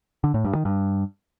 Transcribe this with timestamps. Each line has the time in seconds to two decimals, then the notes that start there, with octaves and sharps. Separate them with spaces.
0.24 D3
0.34 A2
0.44 G2
0.55 D#3
0.65 G2